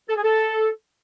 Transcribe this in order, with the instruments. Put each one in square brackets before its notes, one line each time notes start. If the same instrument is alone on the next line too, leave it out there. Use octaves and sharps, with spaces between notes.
[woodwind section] A4
G#4
A4